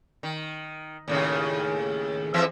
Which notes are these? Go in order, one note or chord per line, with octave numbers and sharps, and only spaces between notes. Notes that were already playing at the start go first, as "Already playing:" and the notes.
D#3
D#2 A2 C#3
F2 E3 E5